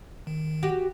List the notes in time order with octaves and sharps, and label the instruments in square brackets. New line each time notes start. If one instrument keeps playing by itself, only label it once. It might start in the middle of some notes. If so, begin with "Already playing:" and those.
[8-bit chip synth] D#3
[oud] F#4 G4